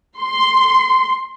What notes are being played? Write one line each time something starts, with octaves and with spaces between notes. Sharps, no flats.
C6